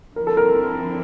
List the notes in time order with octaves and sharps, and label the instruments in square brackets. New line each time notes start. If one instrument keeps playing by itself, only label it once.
[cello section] D3 F3 C4 E4 [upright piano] A#4
[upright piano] A4
A#4